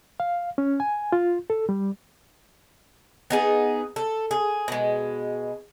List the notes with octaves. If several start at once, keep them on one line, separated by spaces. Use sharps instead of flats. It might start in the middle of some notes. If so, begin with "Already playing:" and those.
F5
C#4
G#5
F4
A4
G3
B3 D#4 G#4
A4
G#4
B2 G#3